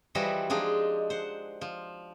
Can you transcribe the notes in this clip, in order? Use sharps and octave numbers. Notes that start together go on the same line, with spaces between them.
E3 F3 G3 F#4 D#5 E5
F3 G#3 D4 D#4
C5 F#5
F3